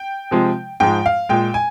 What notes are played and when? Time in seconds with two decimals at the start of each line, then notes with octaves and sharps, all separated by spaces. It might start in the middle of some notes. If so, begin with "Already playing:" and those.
Already playing: G5
0.31 C3 F3 G#3
0.80 G#2 F3 G#3 G5
1.06 F5
1.29 A#2 G#3 G5
1.54 G#5